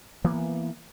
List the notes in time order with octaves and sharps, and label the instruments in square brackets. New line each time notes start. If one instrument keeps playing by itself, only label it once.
[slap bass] E3 A#3 B3